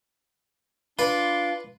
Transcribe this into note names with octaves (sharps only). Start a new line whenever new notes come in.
D4 F4 B4 D6